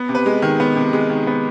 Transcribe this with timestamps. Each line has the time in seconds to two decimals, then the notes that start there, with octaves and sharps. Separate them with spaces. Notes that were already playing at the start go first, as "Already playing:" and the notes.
Already playing: B3
0.09 C3
0.15 B4
0.26 G#3
0.42 D#3
0.60 B3
0.76 C3
0.93 G#3
1.10 D#3
1.27 B3